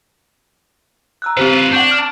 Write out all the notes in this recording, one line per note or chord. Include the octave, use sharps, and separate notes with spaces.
A#5 E6 F#6
C4 F4 G4 B4 C5
D4 F#5 C#6 G6
F6